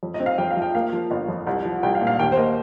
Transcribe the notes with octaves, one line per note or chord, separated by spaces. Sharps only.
F2
D#5
C4
F5
F2 G5
F5
F3
G5
A#3 F5
F3
G1
F2
C2
F3
C2 G5
F5
A#2
F5
D#2 G5
C5
A#3 D#5